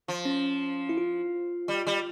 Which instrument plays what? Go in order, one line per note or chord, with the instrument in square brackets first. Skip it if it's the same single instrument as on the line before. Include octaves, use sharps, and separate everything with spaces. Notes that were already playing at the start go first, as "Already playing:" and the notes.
[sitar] F3
[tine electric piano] C#4
E4
F4
[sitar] G3
G3